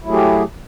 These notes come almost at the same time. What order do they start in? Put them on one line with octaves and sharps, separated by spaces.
E4 F#3 A3 G#4 G4